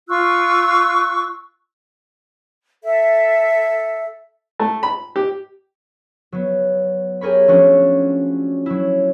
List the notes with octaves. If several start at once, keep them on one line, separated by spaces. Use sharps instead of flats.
F4 C#6 E6 F#6
A4 E5
A3
B5
G4
F#3 B3
G4 G#4 A#4 C#5 B5
F3 A3 C#4 D4 F#4
F#3 E4